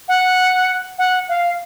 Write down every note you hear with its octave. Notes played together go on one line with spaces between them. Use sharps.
F#5
F#5
F5